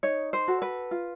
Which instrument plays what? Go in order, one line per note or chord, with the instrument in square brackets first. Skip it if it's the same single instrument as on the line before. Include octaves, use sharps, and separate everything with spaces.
[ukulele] D#4 C#5
C5
F#4 A4
B4
F4